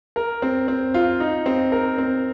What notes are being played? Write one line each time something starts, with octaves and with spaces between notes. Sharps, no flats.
A#4
C4
C4
F4
D#4
C4
A#4
C4